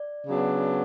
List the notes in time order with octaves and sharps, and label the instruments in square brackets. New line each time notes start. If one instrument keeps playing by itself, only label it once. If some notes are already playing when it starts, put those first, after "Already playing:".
Already playing: [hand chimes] D5
[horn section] C#3 F#3 B3 D4